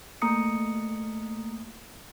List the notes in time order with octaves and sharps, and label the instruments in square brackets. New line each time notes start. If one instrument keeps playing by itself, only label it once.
[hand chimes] A3 A#3 A#5 D#6 C#7